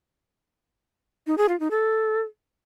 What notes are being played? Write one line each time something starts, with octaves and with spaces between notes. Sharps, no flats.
D#4
G#4
F4
D#4
A4